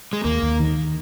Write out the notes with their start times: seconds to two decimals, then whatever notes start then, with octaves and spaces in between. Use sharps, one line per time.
0.13 G#3
0.25 D#2 A#3
0.43 D#2
0.60 D#3